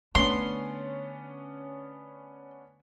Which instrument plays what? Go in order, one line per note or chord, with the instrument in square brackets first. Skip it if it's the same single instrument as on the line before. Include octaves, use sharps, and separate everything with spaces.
[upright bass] D3 A3 [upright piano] B3 C#4 D4 [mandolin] C6